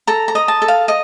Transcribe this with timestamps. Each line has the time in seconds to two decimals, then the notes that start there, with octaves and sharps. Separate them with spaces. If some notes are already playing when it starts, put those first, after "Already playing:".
0.07 A4 A#5
0.28 A#5
0.35 D#5
0.48 A5
0.62 A4
0.68 F5
0.88 D#5